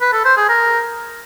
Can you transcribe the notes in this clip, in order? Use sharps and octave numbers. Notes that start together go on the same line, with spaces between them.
B4
A4
C5
G#4
A#4